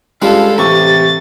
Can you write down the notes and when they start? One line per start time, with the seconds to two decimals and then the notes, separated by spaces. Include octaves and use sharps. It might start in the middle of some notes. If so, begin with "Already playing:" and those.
0.22 C#2 G3 G#3 D4 A4 F5
0.58 A1 C3 C#6 A6